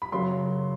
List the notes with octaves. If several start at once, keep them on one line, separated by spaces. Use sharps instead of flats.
B5
F#2 C#3 F#3 C6